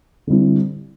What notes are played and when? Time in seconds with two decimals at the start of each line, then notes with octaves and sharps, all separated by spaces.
0.27 D3 G3 C4 E4